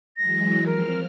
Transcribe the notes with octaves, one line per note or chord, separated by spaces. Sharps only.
E3 F#3 G#3 A#6
F3 C4 A#4 F6